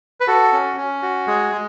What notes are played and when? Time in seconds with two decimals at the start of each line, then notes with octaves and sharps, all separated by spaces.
0.20 B4
0.27 F#4 A4
0.53 C#4
0.77 C#4
1.03 F#4
1.27 G#3 G#4
1.52 G#3